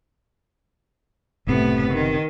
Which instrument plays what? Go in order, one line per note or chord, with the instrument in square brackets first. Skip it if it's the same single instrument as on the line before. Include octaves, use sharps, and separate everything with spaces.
[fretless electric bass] F#1 C3 [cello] A2 B3
[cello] D#3